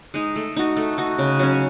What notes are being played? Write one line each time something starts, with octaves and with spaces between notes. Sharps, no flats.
G#3 D#4
A3
D#4 F#4
A3
D#4 F#4
C#3
F#3 C#4